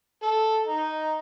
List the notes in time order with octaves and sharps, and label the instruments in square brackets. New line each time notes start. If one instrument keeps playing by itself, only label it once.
[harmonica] A4
D#4